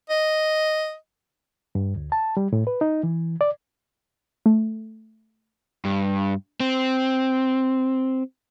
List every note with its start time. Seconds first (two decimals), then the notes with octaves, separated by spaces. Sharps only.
0.10 D#5
1.75 G2
1.96 D2
2.12 A5
2.37 G3
2.53 A2
2.67 B4
2.81 D#4
3.03 E3
3.41 D5
4.46 A3
5.85 G2
6.60 C4